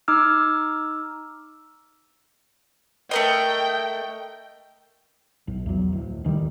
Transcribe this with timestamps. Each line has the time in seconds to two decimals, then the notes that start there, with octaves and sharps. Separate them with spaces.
0.08 D#4 D6 E6 F6
3.11 A3 A#4 D#5 G5
5.48 B1
5.66 E2 F#3
5.92 D1
6.24 D1 D#3 F3 G3